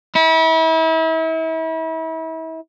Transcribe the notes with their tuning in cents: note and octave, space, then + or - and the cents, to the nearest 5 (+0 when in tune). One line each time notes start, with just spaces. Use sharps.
E4 -35